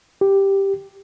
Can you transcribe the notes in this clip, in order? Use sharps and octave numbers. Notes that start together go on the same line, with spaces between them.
G4